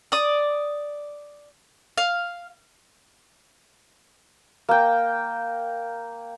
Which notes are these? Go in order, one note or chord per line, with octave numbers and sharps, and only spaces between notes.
D5 D#6
F5
A#3 G5